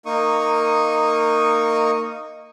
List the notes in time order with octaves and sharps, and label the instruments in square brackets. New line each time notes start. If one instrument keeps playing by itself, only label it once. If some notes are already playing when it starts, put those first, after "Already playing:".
[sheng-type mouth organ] A#3 D#4 C#6 D#6